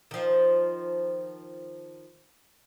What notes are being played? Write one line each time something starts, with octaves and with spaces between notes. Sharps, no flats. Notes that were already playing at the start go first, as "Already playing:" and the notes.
D#3 F3